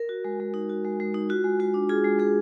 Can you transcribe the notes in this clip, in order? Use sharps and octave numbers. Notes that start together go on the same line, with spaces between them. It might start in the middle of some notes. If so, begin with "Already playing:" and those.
Already playing: A#4
F#4
G#3
G#3
D#4
F#4
G#3
G#3
D#4
F4 F#4
G#3
G#3 F#4
D4
F4 G#4
G#3
G#3 G#4